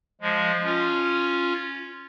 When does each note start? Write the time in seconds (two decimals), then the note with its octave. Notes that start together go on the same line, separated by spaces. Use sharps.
0.21 F3 G#3
0.63 C#4 F4